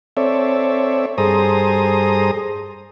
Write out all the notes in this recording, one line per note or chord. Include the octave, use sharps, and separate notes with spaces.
C4 A4 C#5 D5 E5
G2 G#4 A4 C5 A#5 D#6